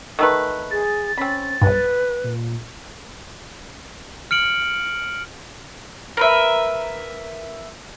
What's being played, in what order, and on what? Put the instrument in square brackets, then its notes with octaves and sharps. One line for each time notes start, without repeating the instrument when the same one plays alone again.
[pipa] D#3 A3 B4
[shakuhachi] G#4 [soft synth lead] A6
[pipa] C4 B5 [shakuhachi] C#4
[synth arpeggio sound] B1 G2 [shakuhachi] B4
[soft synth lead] A#2
[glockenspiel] F6 C#7 D7 F#7
[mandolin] A#4 B4 E5